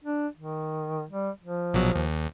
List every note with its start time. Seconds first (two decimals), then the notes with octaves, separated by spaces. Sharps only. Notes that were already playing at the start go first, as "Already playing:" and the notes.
0.04 D4
0.37 D#3
1.11 G3
1.42 F3
1.74 A#1 B2 F#3
1.95 D#2